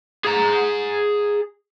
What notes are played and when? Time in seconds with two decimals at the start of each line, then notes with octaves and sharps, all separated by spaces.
0.25 G#4 A#5